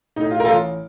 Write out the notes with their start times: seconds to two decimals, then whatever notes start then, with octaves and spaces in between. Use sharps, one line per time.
0.16 A2 D#4
0.31 F4
0.40 A#4
0.45 A1 F4 A4